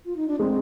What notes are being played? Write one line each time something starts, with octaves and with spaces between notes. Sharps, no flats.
F4
D#4
D4
G#3 C4